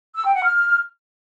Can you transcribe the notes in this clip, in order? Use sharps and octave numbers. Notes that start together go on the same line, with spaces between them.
E6
G5
F#5
F6